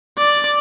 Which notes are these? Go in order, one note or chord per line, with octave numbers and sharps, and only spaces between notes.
D5